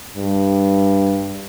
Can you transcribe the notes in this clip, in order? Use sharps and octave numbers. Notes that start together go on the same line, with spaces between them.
G2